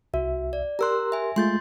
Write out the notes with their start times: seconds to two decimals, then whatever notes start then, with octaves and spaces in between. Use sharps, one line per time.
0.14 C2 F#4 E5
0.53 D5
0.79 G4 A#4 A#5 C6 E6 F#6
1.12 E5 G#5
1.36 G#3 A3 F4 C6 G6 A6